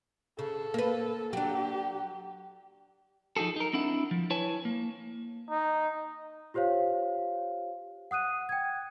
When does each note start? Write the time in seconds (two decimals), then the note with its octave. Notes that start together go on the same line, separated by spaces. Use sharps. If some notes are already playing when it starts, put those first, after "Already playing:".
0.39 C#3 A4
0.74 A#3 B4
1.33 F#3 D4 G4
3.36 F3 D#4 F#4 G#4 A4
3.56 D#4 A#4
3.73 C4 D4 E4 F#5
4.11 F3
4.30 E4 B4 C#5 G#5 A5
4.65 A#3
5.50 D#4
6.54 F4 G4 C5 C#5 F5
8.11 F#5 D#6 F#6 D#7
8.49 G5 G#6